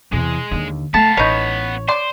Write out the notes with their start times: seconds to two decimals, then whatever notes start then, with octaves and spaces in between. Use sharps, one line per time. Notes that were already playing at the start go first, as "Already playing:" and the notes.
0.12 E2 C3 G#3
0.51 D#2 D3
0.94 A3 B3 F5 A5
1.17 A1 D#4 B4 C#5
1.88 C5 D5 C6